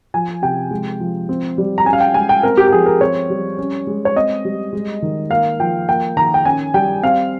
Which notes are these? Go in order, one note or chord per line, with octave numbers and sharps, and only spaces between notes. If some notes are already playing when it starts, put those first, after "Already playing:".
F3 G#5
C3 G5
G#3
F3
C4
G3
A#5
C#4 G#5
F5
G5
G#3 G#5
G5
C4 A#4
G4
G4
F3 G#4
A#4
C4 C#5
G3
C#4
G#3
C#5
C4 D#5
G3
G#3
D#3
A#3 F5
F3 G5
A#3 G5
D#3 A#5
G5
C#4 G#5
G3 G5
C4 F5